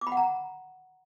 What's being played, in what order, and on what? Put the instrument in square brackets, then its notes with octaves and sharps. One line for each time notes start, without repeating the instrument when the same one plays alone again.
[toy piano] D6
B5
F#5
A#5